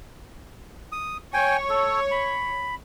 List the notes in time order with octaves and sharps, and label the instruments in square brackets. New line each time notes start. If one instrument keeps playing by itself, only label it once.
[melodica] D#6
[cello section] C#5 [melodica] G5 G#5
[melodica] A4
B5